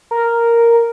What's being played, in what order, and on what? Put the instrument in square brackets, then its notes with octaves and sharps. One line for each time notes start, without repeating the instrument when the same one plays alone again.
[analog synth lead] A#4